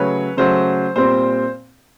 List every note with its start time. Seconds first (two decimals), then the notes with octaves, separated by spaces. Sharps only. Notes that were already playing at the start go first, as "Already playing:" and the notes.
Already playing: C#3 F#3 A3 B4 C#5
0.37 C#3 F#3 A3 C5
0.96 A#2 G3 C4 C5